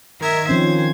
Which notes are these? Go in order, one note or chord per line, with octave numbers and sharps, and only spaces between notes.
D#3 A#4 E5 G#6
F3 C4 C#4 C5